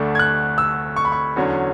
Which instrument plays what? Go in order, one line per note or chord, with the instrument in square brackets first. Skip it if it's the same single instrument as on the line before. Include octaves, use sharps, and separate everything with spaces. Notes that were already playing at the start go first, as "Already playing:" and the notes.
Already playing: [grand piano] D2 D3 A3 D4
G#6
F#6
E6
C#6
B5
C#6
E2 D3 F#3 C#4